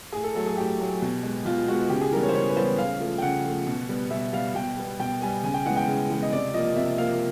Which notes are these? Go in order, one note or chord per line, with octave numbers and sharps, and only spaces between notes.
A2 G#4
A4
F#3 A3 A4
G#4
A2 G4
F#3 A3
B2
G#3 B3
B2 F4
G#3 B3 F#4
C#3 G4
G#4
E3 G3 B3 A#4
C#5
C5
C#3 C#5
B4
E3 G3 B3 C5
C#3 F5
F3 A3
G5
C#3 F#5
F3 A3
B2
G3 B3
B2 E5
G3 B3 F5
B2 G5
G3 B3
B2 G5
G3 B3 G#5
C#3 G#5
G5
E3 G#3 B3 F#5
G5
C#3
E3 G#3 B3
D#5
C3 D5
F3 A#3 D#5
C3 E5
F3 A#3 F5